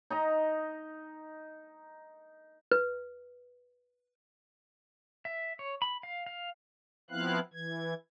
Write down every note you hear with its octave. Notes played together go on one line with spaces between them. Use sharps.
D#4 D#5 A#5
B4
E5
C#5
B5
F5
F5
F3 B3 C4 E4 F5 F#6
E3 G#6